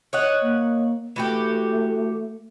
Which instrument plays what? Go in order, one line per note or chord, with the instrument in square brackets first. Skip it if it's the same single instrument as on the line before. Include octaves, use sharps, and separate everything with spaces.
[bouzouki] C#5 D#5 F#5
[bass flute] A#3
[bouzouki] E3 F#4 G4 [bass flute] A3